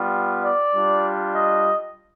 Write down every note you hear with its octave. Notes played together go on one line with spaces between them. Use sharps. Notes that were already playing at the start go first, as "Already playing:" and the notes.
Already playing: G3 B3 F4
D5
G3 D4 F4
D#5